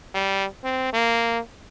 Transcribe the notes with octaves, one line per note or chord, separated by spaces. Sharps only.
G3
C4
A#3